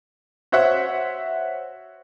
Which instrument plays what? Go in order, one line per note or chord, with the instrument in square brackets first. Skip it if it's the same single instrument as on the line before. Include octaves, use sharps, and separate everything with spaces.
[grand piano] F#4 C5 C#5 E5 F#5